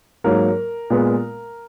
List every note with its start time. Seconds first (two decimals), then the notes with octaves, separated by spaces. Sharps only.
0.24 G#2 F#3 A#3 A#4
0.90 A#2 G#3 B3